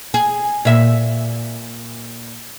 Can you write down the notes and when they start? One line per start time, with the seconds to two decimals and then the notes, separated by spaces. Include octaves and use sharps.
0.14 G#4
0.65 A#2 E5